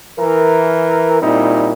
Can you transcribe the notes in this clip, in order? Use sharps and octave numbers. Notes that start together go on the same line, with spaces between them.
E3 A#4
A#2 G3 C4 D#4 E4